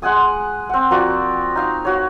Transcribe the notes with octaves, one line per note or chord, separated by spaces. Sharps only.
G#3 F#5 G#5 D#6
C4 F#5
F3 A#3 F#4 D5
D#4 F5
F#4 C#5